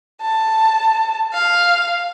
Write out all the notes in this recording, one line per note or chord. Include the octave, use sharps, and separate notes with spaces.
A5
F5